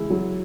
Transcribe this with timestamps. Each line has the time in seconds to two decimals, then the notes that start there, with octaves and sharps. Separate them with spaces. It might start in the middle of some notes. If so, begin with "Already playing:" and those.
Already playing: C#2 C#3 E3 G#3 E4
0.10 F#3